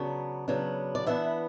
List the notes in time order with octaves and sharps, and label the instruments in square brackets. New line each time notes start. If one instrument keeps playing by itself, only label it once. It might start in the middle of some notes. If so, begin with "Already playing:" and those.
Already playing: [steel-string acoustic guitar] C#3 F#3 B3 D4
C#3 F#3 B3 D4
D5
E3 B3 D4 E5